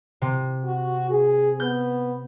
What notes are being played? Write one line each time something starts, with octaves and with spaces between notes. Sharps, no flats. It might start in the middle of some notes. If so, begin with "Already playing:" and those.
C3
F#4
G#4
B3 G6